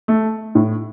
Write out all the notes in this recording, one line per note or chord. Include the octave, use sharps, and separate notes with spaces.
A3
A2